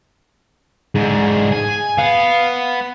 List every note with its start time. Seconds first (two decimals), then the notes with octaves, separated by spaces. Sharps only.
0.95 G#2 D3 G#4
1.53 G#5
1.98 B3 F5